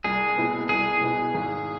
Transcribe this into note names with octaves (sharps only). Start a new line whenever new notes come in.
C2 G#4
B2 B3 E4
C2 G#4
B2 B3 E4
G#1